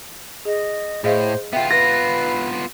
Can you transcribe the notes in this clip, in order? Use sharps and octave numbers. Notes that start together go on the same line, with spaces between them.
G#4 D#5
A2 G#4 C5 D#5 F5
B3 F4 E5 G5
B4 A#6